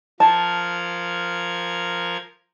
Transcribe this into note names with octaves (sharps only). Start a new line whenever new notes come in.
F3 A#4 A5 G#6